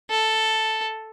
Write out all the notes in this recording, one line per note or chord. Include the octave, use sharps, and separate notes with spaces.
A4